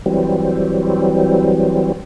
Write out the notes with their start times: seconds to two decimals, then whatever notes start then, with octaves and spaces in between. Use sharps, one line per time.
0.06 E3 F#3 G3 C4